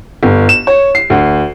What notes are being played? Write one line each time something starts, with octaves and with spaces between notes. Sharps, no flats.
G1
E7
C#5
C7
D2